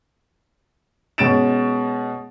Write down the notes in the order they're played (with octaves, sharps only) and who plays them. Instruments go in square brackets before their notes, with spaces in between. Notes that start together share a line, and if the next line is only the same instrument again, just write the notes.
[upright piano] B2 G#3 C#4 A6 D7 E7